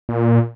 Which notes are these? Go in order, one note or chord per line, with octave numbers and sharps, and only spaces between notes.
A#2